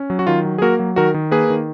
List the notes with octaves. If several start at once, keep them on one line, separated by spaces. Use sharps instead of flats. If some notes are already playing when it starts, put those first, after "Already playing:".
Already playing: C#4
F#3
F#4
D#3 F4
F#3
G#4
A#3 F#4 A#4
F#3
D#3 F#4 A#4
D#3
A#3 G#4 B4
D#3